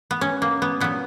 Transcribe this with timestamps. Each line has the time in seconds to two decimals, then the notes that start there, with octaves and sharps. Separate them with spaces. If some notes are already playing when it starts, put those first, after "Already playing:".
0.11 B3
0.21 C#4
0.42 A#3
0.62 B3
0.80 A#2 F#3 B3